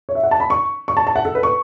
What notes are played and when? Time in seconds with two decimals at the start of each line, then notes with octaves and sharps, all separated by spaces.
0.09 C#5
0.15 E5
0.23 F#5
0.31 A5
0.40 B5
0.50 C#6
0.88 C#6
0.97 A5
1.07 A5
1.16 F#5
1.25 A4
1.35 B4
1.43 C#6